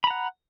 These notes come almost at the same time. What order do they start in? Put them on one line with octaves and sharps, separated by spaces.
B5 A#5 F#5